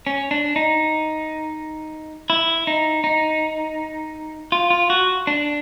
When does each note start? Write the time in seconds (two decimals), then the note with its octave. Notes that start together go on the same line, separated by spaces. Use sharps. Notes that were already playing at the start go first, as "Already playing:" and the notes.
0.07 C#4
0.31 D4
0.56 D#4
2.30 E4
2.67 D#4
3.04 D#4
4.52 F4
4.70 F4
4.90 F#4
5.27 D4